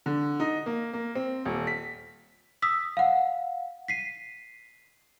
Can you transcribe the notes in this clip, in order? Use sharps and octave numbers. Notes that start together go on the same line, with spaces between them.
D3
D#4
A#3
A#3
C4
D#1
B6
D#6 E6 B6
F5 F#5
B6 C7 D#7